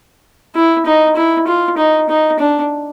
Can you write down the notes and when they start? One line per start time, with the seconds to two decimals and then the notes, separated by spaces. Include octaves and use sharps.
0.55 E4
0.86 D#4
1.16 E4
1.47 F4
1.78 D#4
2.09 D#4
2.39 D4